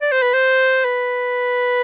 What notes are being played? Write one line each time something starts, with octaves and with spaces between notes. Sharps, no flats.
D5
C5
B4
C5
B4